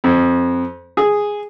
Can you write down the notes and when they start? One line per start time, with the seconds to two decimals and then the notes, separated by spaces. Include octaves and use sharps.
0.04 F2
0.97 G#4